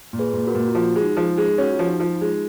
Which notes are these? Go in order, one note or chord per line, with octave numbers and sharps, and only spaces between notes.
A#2
G#4 B4
A#2
F#4 A#4
A#2
F4
F3 F#4
G#3
D#4
F3
D#4
G#3
G#4
C#4 F#4
F4
F3
D#4
F3
D#4
F4
G#3